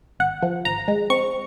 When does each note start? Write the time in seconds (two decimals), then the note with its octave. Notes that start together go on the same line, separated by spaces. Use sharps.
0.19 G#1 F#5
0.42 F3
0.65 G#1 A#5
0.88 G#3
1.10 C4 C#6